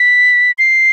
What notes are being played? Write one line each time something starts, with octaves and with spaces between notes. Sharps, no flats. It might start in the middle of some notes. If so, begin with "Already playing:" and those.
Already playing: B6
C7